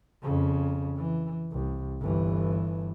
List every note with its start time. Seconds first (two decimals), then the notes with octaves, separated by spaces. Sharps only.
0.22 F2 C#3
0.97 E3
1.52 C2
2.01 G1 E3